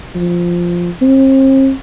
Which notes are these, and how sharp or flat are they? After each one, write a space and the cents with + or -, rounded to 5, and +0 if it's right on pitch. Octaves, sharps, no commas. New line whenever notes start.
F3 -5
C4 +40